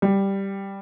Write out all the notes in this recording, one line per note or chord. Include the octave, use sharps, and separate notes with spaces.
G3